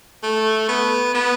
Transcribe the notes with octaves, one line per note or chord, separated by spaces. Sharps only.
A3
B3
B3